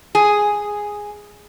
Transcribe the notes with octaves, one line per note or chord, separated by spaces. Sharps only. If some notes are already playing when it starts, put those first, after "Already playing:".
G#4